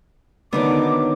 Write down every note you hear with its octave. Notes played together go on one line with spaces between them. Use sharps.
D3 D#3 F#3 B3 D6